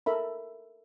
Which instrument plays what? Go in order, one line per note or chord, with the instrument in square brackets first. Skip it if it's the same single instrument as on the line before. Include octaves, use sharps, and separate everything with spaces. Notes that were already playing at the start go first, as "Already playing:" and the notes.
[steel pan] A4 A#4 E5 B5